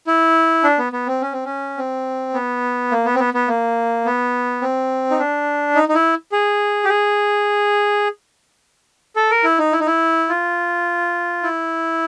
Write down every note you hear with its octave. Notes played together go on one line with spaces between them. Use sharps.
E4
D4
B3
B3
C4
C#4
C4
C#4
C4
B3
A#3
B3
C4
B3
B3
A#3
B3
C4
D#4
D4
D#4
D#4
E4
G#4
G4
G#4
A4
A#4
E4
D#4
E4
D#4
E4
F4
E4